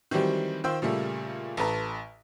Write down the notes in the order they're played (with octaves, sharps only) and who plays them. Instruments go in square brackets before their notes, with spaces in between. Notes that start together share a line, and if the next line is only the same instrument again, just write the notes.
[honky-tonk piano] D#3 E3 F#3 G3 C4 G4
D#3 F4 C5 G5 E6
A#2 C#3 G3 A3 A#3
A1 A4 B4 A#5